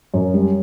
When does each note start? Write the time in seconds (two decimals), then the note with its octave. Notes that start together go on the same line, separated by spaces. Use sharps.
0.14 F#2
0.34 G3